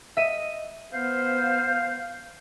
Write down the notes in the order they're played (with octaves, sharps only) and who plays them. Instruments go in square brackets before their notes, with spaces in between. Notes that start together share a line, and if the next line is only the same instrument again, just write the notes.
[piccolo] D#5 [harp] E5 D#7 E7
[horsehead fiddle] B3 C5 [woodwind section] F5 [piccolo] G6